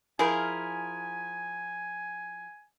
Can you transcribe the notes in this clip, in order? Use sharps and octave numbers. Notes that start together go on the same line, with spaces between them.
F3 E4 G#4 A#4 G#5